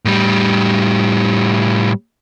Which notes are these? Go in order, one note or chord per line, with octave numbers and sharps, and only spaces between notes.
A2 G3